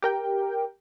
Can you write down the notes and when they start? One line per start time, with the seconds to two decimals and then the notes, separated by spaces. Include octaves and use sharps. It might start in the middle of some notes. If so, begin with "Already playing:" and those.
0.02 G4 A#4 G5